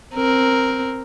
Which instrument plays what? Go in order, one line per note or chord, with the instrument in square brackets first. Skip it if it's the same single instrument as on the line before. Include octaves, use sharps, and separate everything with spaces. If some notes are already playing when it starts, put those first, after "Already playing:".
[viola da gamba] C4 A#4